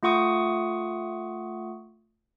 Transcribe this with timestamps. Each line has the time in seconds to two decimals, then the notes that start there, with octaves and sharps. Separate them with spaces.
0.03 A3 F4 F#5 C#6 D#6